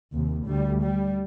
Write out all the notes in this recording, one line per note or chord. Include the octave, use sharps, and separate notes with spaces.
D#2 C3
D2 G3
G3